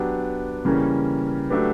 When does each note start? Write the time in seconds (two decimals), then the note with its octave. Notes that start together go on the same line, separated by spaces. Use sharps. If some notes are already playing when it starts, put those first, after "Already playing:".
Already playing: F#3 B3 D4 G4
0.65 C#3 E3 G3 A#3 C#4
1.50 F#3 A3 D4 G4 B4